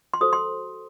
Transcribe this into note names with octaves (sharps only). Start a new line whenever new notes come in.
C6
F#4 A4 C5 D#6
C6